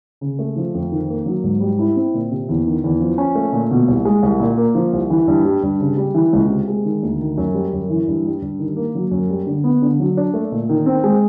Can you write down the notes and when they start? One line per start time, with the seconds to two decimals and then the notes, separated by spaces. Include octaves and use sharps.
0.21 C#3
0.39 A3
0.56 F3
0.74 F2
0.91 D#3
1.09 A#3
1.26 F#3
1.44 G#2
1.60 G3
1.79 E4
1.96 C4
2.14 A#2
2.31 C3
2.49 E2
2.66 D#3
2.84 E2
3.00 F3
3.18 C#4
3.35 A3
3.53 A#2
3.71 B2
3.88 C2
4.05 G#3
4.23 C2
4.40 A#2
4.57 A#3
4.75 F3
4.93 C2
5.10 E3
5.28 G2
5.45 G3
5.63 G2
5.81 C#3
5.97 G3
6.14 E3
6.33 C#2
6.49 C3
6.68 G#3
6.85 D#3
7.03 D2
7.20 D#3
7.38 F#2
7.54 G3
7.73 F#2
7.90 E3
8.08 G2
8.25 G3
8.42 G2
8.59 D#3
8.76 A#3
8.95 F#3
9.11 F#2
9.30 G3
9.46 D3
9.64 B3
9.82 D3
10.00 F#3
10.17 D4
10.34 A3
10.52 A#2
10.69 D#3
10.86 C4
11.04 G#3